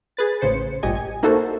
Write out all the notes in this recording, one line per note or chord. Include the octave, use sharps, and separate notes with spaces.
G#4 B4 A6
A1 C#3 C5 C#7
A1 G2 A#2 G4 D#5 G#5
G#5
A#3 D#4 E4 F#4 A4 C5